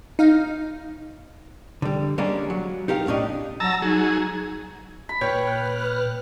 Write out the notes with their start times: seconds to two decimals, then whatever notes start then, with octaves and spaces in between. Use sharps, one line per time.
0.19 D#4 F5
1.82 D3 G3
2.18 G3 G#3 A#3 C#4 D4
2.50 F#3
2.88 D#4 G4 A#4 F5
3.06 B1 A2 C#4 D4 D#5
3.60 F#3 A5 A#5 E6
3.82 F#3 D#4 G#4
5.09 B5
5.21 A#2 B4 C#5 G5 F6 F#6